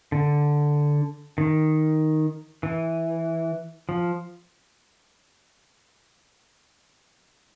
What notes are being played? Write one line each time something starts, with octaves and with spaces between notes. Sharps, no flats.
D3
D#3
E3
F3